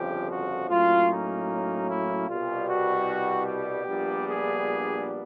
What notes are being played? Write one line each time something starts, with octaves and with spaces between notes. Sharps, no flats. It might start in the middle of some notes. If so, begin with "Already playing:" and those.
Already playing: G1 F2 C#3 F3 G4
F#4
A2 F#3 A#3 C#4 F4
D#4
E4
C2 B2 G3 F4
F#4
G4
A#1 A#2 G3 B3 D4
G#4